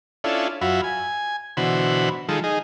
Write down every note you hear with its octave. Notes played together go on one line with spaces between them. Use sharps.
C#4 D4 E4 F4 A4
F#2 F4 F#4 E5 B5
G#5
B2 D3 E3 F#4 C5 B5
D#3 F3 G#3 A4
D#4 G#4